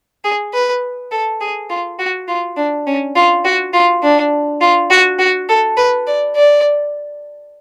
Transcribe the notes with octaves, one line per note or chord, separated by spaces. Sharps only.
G#4
B4
A4
G#4
F4
F#4
F4
D4
C#4
F4
F#4
F4
D4
F4
F#4
F#4
A4
B4
D5
D5